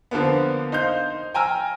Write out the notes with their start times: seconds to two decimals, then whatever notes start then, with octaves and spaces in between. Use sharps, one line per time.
0.11 D3 F3 A#3 B3
0.72 D#4 C5 F5 G6
1.34 G5 G#5 A#5 E6 F6